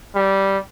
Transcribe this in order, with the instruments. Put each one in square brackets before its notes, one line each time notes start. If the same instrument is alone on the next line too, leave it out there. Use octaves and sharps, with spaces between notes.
[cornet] G3